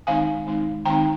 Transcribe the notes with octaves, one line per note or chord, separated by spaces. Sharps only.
D#3 G#3 C4 D#4 F5 G#5
D#3 G#3 C4 D#4
D#3 G#3 C4 D#4 G5 A#5